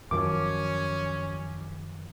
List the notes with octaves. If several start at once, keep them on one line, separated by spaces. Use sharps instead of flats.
F#2 D#3 F3 C#4 D6